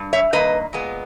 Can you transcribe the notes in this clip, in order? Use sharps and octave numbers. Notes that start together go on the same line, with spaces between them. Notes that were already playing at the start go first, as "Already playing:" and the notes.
Already playing: G2 G3
C#5 E5
G2 D#3 A#3 B4 D#5
A#2 G#3 B3